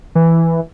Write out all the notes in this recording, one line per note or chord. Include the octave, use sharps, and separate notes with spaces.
E3